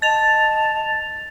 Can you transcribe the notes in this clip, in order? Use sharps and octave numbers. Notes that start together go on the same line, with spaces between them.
D#5 A5 A6 F7